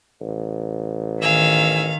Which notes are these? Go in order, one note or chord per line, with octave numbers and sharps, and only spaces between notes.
A1
D#3 F5 G#5 E6